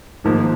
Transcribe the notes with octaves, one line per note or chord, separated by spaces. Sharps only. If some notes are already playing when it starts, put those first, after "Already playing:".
G#1 G#2 F3 A#3